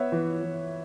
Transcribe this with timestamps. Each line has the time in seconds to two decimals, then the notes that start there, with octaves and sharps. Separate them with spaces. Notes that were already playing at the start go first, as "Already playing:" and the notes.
Already playing: B3 C#5 E5
0.12 E3
0.42 E3